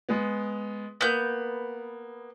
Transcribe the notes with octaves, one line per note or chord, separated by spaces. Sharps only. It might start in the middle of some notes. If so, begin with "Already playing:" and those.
G#3 B3
A#3 B3 G6 F#7